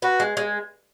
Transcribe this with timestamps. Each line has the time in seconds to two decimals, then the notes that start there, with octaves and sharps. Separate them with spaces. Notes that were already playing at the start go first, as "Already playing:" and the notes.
0.02 F#4 B4
0.20 G#3
0.37 G#3